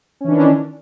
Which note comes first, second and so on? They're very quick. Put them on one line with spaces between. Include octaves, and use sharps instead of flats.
C#4 E3 D4 D#3